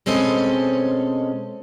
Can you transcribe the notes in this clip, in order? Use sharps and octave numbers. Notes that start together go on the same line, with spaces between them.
B2 G#3 C4 C#4 A4 D#5